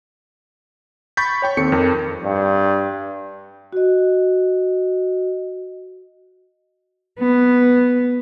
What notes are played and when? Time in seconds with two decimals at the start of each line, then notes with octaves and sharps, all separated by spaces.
1.17 B5 C#6 G6 A6 B6
1.42 C#5 G5 C#6
1.57 D#2 C4 A4 C#7
1.72 F2 A#4
2.24 G2
3.73 F#4 D#5
7.21 B3